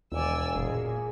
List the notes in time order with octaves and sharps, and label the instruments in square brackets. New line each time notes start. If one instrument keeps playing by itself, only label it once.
[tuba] E1 [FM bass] D#2 [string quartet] D5 G#5 E6
[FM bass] F#1 [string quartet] A#2 [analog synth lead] G#4